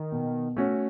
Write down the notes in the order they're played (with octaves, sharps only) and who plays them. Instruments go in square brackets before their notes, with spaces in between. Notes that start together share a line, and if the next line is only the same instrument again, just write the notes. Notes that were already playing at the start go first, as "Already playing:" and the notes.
Already playing: [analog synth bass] D#3
[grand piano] B2
A3 C#4 F#4